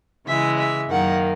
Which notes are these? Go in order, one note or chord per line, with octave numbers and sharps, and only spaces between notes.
C#3 E3 G#3 E5
E5
F#2 D#3 A#3 F#5